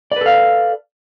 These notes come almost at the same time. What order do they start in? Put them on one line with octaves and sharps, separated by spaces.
D5 B4 A4 F5